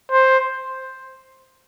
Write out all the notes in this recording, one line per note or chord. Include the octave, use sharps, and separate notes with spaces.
C5